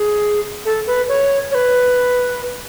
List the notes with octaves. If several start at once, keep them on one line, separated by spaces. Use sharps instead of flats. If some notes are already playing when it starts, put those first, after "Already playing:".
Already playing: G#4
A4
B4
C#5
C#5
B4